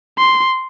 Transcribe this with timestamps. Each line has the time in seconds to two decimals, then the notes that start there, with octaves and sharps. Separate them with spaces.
0.18 C6